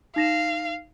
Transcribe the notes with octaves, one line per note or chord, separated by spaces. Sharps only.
D#4 F5 A#6 E7